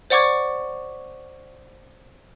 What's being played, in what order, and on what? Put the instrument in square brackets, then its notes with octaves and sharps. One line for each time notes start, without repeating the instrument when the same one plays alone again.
[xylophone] C5 D5 F#5 C#6 D6 G#6